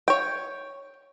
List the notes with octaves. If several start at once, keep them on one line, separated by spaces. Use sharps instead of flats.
C#5 G5